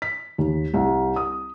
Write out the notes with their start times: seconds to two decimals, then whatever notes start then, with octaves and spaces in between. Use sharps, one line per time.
0.02 B6
0.38 D#2
0.74 C2
1.16 D#6